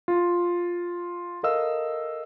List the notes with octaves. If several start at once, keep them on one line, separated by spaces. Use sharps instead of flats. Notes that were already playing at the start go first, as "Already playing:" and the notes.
F4
A4 A#4 D#5 F5 E6